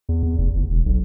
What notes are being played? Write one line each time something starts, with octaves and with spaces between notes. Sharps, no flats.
E2
E2
F1
F#1
E1
B1